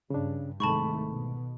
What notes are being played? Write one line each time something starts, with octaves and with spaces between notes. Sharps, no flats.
G2 C#3 D4
C2 G#2 D#3 A3 A5 B5 C#6
B2